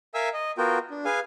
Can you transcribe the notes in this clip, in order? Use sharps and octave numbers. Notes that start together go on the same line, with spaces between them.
A#4 E5 F5 G#5 E6
D#5
B3 F4 F#4 A#4 G5
D4
G#4 B4 F5 G#5